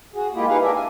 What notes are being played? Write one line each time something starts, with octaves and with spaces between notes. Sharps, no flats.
F#4 G#4
G#3 A#3 E4 F4 G4
D#4 E4 G#4 B4 F5
D4 G4 G#4 A#4 D5 E5
G#5